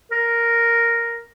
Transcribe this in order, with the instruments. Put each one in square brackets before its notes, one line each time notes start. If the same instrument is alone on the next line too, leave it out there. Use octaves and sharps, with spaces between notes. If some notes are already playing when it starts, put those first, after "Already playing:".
[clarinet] A#4